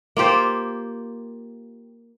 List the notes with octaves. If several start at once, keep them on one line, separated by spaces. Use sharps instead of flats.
A#3 F4 G4 C5